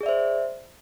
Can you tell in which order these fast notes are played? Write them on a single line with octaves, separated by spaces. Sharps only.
G#4 D5 E5 C5